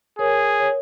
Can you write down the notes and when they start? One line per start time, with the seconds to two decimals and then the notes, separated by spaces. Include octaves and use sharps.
0.19 G#4 A#4 C#5
0.60 C#5